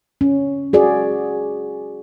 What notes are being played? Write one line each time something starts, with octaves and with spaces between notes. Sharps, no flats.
C#4
F#4 G#4 D5